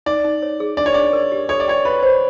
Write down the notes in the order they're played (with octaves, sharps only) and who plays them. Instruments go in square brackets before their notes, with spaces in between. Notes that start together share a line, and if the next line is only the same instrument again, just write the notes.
[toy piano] D#4 [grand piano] D5
[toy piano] D#4
C#5
G#4
[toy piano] D4 [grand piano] D5
[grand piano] C#5
[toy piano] D4 [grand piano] D5
[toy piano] A#4
G4
[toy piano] A4 [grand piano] C#5
[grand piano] D5
[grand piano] C#5 [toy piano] G5
[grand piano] B4 [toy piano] E5
[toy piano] C5